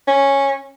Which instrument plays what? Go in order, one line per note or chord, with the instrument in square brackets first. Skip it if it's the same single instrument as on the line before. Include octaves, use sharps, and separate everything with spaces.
[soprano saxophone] C#4